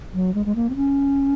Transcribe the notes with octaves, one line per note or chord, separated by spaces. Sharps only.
F#3
G#3
G#3
A#3
C4
C#4